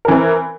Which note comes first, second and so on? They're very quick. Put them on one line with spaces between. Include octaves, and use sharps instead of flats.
A#4 E3 C4